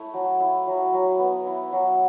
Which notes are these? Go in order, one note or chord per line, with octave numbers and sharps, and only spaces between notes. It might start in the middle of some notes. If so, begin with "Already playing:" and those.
Already playing: A3 E4 C#5
F#3
E4
F#3
F#3
B3
E4
F#3